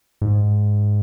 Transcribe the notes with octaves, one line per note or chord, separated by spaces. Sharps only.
G#2